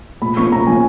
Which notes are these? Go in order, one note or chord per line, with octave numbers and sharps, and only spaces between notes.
A#2 B5
F3 A#3 C#4 C#6
A#2 A#5
F3 A#3 C#4 G#5